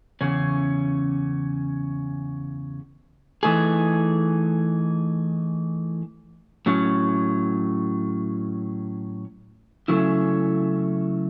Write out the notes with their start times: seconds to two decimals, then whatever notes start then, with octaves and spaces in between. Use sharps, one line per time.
0.21 E2 C#3 C#4
3.43 E3 A3 D#4 G#4
6.66 A2 F#3 C#4
9.88 C#3 F#3 A3 C#4 E4